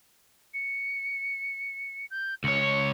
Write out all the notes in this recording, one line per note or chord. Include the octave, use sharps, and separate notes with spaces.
C#7
G6
C#2 C#5 C#7